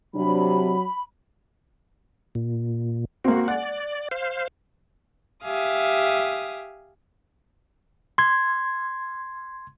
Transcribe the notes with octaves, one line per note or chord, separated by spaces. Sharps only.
C3 F#3 D4 B5
A#2
A#3 C4 F#4
D5 F#5
C5 F5
G4 E5 F5 G#5 D#6
C6 G#6